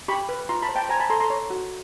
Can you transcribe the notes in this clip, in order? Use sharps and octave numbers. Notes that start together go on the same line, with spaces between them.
G4 B5 C#6
B4
F4 A#5 C6
A5 B5
C5
G5 A5
C5 G#5 A#5
A5 B5
A4 A#5 C6
A#5 C6
C#5
F#4